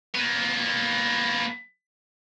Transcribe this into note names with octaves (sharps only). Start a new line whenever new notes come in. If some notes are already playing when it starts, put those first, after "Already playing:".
A#3 B3